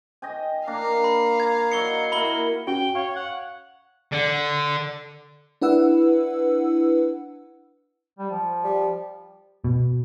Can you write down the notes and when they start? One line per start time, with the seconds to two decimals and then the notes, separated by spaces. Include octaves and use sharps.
0.22 D#5 G5 G#5
0.67 A#3 D4 F5 A#5
1.04 B5
1.40 G#6
1.72 F#3 D#5 C#7 G7
2.12 A#3 E4 F#4 A#4 B5 G7
2.67 C#4 F#4 G5
2.95 C#5 F5
3.16 F#5
4.12 D3
5.62 D4 E4 B4 F#5 E6
8.18 G3
8.31 F3
8.64 G3
9.64 B2